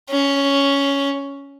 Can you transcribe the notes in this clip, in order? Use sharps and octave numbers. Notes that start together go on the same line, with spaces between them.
C#4